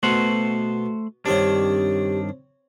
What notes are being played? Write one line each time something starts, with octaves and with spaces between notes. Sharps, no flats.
B2 A3 C5 F#5
G2 D#3 C4 D4 G4 C#5